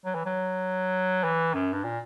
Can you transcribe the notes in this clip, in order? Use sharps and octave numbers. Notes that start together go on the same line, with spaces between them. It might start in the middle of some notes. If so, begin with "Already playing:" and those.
F#3
E3
F#3
E3
F#2
G2
A#2